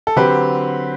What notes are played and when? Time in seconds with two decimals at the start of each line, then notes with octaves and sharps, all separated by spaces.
0.07 A4
0.16 D3 F#3 C4 G4 B4